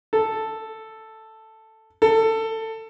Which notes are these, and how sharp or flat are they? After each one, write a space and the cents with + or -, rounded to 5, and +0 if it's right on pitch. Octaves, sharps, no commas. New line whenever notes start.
A4 +5
A4 +20